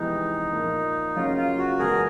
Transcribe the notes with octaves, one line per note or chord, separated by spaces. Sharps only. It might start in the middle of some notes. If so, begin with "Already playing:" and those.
Already playing: F2 C3 E3 G#3 B3 D#4
A#2 F3 A#3
F#2 C#3 F#3 A#3 C#4 F4
F4
F#4
F#1 E2 B2 G#3 G#4 A#4